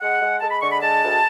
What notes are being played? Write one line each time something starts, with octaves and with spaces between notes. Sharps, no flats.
G#3 F#5
G#3
G#3 A5
B5
D3 C#6
B5
G#3 A5
D2